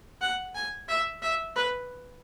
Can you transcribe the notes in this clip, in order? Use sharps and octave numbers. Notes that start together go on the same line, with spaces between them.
F#5
G#5
E5
E5
B4